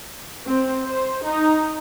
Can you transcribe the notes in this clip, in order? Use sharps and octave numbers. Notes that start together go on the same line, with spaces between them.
C4
C5
D#4